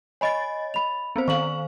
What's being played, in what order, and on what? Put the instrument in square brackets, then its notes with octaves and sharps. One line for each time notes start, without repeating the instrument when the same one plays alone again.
[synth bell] C#5 D#5 A6 [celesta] G#5 B5
[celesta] B5 F7
[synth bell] B3 C4 C5
[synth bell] D#3 C5 F5 [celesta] C#6 F#7